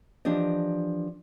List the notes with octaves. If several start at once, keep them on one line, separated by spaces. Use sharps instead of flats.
E3 F3 D4 G4 D5 D#5